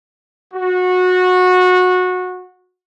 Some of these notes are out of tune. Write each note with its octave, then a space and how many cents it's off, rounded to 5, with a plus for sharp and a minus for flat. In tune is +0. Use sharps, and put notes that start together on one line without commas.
F#4 -20